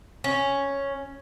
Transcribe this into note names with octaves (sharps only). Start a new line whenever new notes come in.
C#4